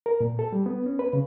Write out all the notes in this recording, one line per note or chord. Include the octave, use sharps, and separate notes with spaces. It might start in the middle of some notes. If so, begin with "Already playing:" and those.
A#4
A#2
A4
G3
B3
C#4
B4
C#3